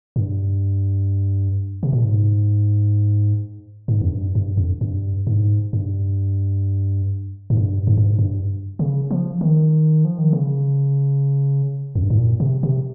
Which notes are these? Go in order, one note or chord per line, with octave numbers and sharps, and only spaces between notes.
G#2
G2
C3
A#2
G#2
G#2
F2
G2
G2
F2
G2
G#2
G2
G#2
G2
G#2
G2
G#2
G2
C#3
F3
D#3
F3
D#3
C#3
F2
G2
G#2
A#2
C3
C3